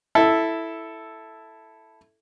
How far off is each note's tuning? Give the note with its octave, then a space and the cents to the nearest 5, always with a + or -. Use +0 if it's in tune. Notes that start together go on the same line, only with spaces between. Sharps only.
E4 +0 A4 +0